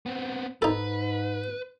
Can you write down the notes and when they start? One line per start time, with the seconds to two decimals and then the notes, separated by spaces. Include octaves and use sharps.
0.06 B3 C4
0.62 G#2 D#4 A4 B4